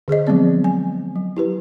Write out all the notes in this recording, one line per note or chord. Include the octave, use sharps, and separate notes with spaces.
D3 G#4 C5 D#5
F3 F#3 G#3 B3 C4 D5
G#5
F#3
E4 G4 B4